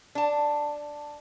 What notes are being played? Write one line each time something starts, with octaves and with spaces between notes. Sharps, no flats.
D4 A5